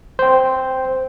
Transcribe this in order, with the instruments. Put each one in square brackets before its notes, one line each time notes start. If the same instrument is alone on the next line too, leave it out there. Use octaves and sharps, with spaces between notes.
[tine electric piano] C5 G5